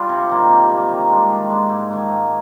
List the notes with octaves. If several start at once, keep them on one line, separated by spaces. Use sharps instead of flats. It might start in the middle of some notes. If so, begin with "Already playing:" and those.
Already playing: G3 D4 F4
C3
D#3 A#3
C3
D#3 A#3
D#3
G#3 D4
D#3
G#3 D4
G#2
D#3 A#3
G#2